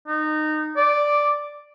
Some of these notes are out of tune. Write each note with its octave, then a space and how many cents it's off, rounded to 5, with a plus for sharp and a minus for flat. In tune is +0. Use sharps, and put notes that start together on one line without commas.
D#4 -20
D5 +0